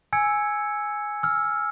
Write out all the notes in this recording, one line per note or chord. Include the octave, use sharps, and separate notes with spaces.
G#5 E6 G#6 C#7
E6 F6